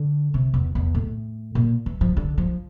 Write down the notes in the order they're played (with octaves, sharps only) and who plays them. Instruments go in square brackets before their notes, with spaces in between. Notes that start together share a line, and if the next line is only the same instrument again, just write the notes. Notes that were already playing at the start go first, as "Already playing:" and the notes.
Already playing: [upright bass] D3
C3
E2
E2
A2
A#2
E3
F3
D3
F3